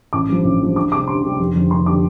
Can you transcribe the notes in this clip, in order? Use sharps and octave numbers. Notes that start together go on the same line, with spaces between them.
A1 D6
G2 F3
A1
G2 F3
D2 D6
C3 G3 D6
D2 C6
C3 G3
F1
F2 D3 G3
F1 C6
D3 G3 D6